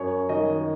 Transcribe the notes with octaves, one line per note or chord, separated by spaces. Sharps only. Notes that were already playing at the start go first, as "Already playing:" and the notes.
Already playing: F#2 C#5
D#3 D#5